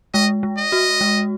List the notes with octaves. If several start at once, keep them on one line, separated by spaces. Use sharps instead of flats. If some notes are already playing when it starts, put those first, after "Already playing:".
G#3 D#5
G#3
D#5
F#4
G#3